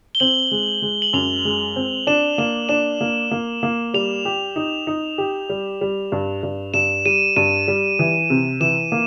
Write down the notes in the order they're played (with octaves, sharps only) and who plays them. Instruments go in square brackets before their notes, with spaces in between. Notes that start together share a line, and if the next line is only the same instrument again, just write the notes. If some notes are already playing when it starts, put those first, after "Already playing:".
[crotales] G7
[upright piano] C4 [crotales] F#7
[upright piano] G#3
G#3
[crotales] F#7
[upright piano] F#2 [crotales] F7
[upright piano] G#3
C4
[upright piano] D4 [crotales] E7
[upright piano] A#3 [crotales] E7
[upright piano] D4 [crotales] E7
[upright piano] A#3
A#3
A#3
[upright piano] G3 [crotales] F7
[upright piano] G4
D#4
D#4
G4
G3
G3
G2
G2
[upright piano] G2 [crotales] E7
[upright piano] G3 [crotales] D#7
[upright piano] G2 [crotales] D#7
[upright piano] G3
E3
C3
[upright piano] E3 [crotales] E7
[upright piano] A#3